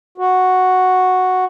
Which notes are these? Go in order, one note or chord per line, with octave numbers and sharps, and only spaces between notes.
F#4